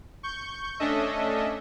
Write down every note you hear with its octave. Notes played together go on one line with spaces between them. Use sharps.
C#6 G6
A3 C#4 D4 A4 D#5 E5